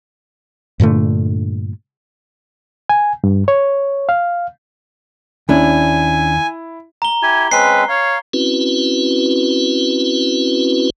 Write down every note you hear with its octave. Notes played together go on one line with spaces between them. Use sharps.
G2 A#2 D3 A3
G#5
G2
C#5
F5
D#2 C#4 D4 E4 G#5
A#5 G7
E4 G4 G#5
G#3 C4 C#4 B4 C7
C#5 F5
C4 C#4 E4 F#4 B4